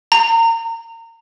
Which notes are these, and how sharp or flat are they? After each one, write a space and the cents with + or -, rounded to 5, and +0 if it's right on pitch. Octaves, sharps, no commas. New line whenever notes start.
A#5 -30